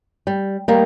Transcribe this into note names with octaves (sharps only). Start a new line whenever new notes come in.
G3
D#3 G3 A#3